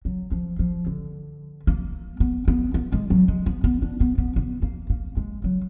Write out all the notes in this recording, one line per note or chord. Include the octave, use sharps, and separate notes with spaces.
F#3
F3
F3
D3
A#3
B3
B3
B3
G#3
F#3
G#3
B3
B3
D4
B3
B3
B3
A#3
A#3
G#3
F#3